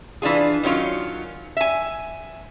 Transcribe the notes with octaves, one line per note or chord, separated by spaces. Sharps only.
E3 D4 F4 G#4
D#3 F#3 C#4 F4
E5 G#5